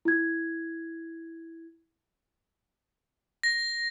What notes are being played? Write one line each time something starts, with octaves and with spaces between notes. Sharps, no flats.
E4 G#6
A#6